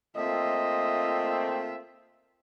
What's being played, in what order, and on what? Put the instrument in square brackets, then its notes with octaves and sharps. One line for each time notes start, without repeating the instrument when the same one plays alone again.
[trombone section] A3 A#3 C4 [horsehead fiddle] F4 E5 [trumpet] D#5